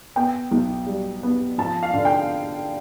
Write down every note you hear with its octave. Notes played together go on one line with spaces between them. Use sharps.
B3 G5
B1
G3
B3
F3 A5
F5
D3
G5